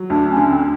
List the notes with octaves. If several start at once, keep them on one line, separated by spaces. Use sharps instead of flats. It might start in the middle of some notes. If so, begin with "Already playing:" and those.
Already playing: F#3
D2 D4
C#4
D3
C4